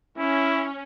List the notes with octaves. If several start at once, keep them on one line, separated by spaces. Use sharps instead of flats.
C#4 E4